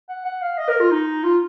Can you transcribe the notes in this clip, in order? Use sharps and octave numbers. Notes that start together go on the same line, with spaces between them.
F#5
F#5
F5
D#5
A#4
F4
D#4
F4